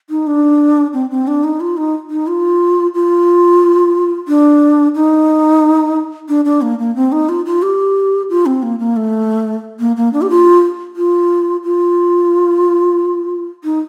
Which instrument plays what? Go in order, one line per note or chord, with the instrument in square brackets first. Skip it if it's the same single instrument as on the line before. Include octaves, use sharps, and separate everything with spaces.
[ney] D#4
D4
C4
C4
D4
D#4
F4
D#4
D#4
F4
F4
D4
D#4
D4
D4
A#3
A#3
C4
D#4
F4
F4
G4
F4
C4
A#3
A#3
A3
A#3
A#3
D4
G4
F4
F4
F4
D#4